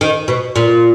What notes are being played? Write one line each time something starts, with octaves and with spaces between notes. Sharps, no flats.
D#3
B2
A#2